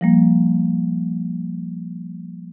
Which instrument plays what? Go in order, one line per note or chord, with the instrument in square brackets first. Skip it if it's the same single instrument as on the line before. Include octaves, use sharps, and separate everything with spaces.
[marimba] F3 G3 A#3